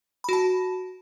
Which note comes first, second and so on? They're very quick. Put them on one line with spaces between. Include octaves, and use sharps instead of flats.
B5 F#4 A5